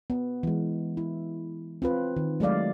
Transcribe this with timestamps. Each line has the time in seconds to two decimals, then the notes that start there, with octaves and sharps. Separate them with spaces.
0.10 B3
0.43 E3 G#3
0.97 E4
1.82 C4 F4 B4
2.16 D#3
2.40 F#3 G#3 A3 D5 F5